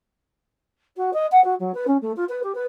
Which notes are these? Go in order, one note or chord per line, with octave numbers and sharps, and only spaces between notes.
F#4
D#5
F#5
F#4
F#3
B4
C#4
A3
F4
B4
G4
B4